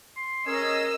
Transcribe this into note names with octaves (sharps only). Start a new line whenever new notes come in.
C6
C#4 G#4 A#4 D#5 E6